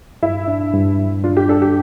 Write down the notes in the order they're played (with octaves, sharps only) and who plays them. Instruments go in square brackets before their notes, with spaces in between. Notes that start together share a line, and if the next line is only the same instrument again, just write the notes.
[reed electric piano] G2 [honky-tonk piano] E4
[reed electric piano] D4
G2
G3
[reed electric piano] D4 [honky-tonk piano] F4
[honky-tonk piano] G4
[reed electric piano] D4 [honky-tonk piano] A4
[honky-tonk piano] G4